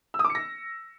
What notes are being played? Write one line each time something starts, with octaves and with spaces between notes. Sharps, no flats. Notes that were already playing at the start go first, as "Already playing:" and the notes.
E6
D#6
D6
C#7
A#6